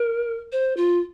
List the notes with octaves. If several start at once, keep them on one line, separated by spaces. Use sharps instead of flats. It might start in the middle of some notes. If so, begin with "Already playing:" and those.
Already playing: A#4
C5
F4